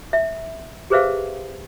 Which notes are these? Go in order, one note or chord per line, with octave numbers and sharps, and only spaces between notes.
E5
G4 G#4 B4 C5 E5 F5